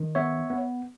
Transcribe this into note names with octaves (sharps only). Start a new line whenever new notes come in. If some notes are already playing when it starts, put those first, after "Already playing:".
Already playing: D#3
B3 C#5 E5
B3